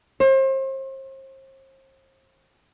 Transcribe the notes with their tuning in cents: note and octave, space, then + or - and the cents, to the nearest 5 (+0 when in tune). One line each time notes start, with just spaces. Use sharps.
C5 +35